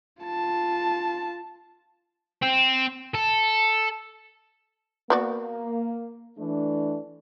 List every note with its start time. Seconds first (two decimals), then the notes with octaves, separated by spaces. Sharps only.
0.23 F4 A5
2.42 C4
3.14 A4
5.10 A#3 B3 F#4 D5
6.38 E3 A3 D4